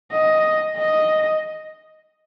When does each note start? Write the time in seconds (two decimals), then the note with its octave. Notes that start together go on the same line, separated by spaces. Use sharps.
0.11 D#5
0.76 D#5